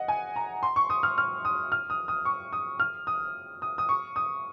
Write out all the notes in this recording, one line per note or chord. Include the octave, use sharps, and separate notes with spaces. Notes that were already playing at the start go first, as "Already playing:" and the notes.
Already playing: D#5 F#5
G#5
A#5
C6
C#6
D#6
F6
F6
D#6
F6
D#6
D#6
C#6
D#6
F6
D#6
D#6
D#6
C#6
D#6